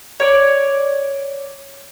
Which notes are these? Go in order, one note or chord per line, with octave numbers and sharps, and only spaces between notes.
C#5 D5